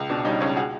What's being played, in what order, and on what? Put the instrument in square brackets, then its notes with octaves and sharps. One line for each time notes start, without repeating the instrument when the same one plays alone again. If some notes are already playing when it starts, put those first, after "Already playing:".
Already playing: [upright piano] C#2
B2 D4
G3 C#4 D#4
C#2 C#4 D#4
F#4 G#4